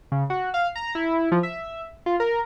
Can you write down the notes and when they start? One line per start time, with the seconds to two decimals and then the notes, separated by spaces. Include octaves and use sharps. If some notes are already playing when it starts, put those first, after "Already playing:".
0.12 C#3
0.30 F#4
0.54 F5
0.75 A#5
0.95 E4
1.32 F3
1.43 E5
2.06 F4
2.20 A#4